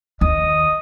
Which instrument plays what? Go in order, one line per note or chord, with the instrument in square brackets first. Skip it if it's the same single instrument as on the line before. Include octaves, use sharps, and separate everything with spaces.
[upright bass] D#2 [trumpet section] D#5 D#6